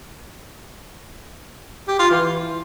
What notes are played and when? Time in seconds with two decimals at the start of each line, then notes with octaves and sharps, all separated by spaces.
1.88 G4
1.99 F4
2.10 E3